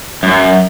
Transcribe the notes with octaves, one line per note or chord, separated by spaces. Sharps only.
F#2